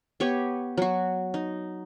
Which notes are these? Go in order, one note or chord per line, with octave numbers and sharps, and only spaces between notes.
B3 G4 C#5
F#3 F#4
D#4